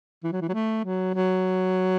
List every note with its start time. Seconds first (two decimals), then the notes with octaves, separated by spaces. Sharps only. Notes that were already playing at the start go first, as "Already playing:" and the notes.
0.23 E3
0.32 F#3
0.41 E3
0.49 F#3
0.53 A3
0.84 F#3
1.14 F#3